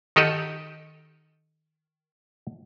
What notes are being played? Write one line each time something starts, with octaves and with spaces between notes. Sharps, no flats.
D#3 D#4 G4 A4 D#5 F#5